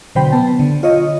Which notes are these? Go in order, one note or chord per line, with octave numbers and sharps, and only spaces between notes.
B2 D3 F#3 C5 G5 B5
B3 A5
D3
F4 C#5 D#5